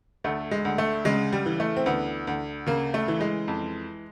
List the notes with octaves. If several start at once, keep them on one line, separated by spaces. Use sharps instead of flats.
D2 A3
G#3
D2
A3
C#3 G#3
G3
E3
A3
C4
D2 B3
D2
C#3 A#3
A3
E3
G#3
F2